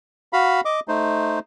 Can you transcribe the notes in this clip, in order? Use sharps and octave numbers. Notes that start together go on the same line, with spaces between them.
F#4 F5 B5
D#5 D6
A3 D#4 C5